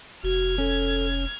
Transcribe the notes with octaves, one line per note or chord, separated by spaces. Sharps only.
F1 F#4 F6 G#6
C#4 A4